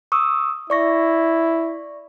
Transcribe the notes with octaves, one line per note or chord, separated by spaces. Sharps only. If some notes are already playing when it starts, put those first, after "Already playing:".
C#6 D#6 E6
E4 D5 C#6 A#6